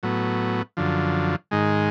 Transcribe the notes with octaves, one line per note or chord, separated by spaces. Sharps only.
A2 F#3 B3
F#2 D3 F3
G#2 D#3 G#3